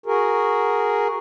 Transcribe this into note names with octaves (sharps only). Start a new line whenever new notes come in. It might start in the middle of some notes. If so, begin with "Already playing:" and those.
F#4 G#4 A#4